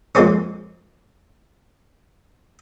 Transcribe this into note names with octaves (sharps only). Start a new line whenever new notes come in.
F2 G#3 A#3 C4 C#4